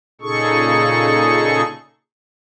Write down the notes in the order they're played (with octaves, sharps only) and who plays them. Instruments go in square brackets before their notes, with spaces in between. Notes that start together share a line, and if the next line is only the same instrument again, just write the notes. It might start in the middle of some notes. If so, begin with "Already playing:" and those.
[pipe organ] A#2 C#3 D#4 G#4 A4 C#6